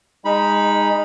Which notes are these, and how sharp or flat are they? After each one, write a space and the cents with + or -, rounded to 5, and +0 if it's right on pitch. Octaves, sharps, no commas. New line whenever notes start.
G#3 -25 D#4 +0 B5 -15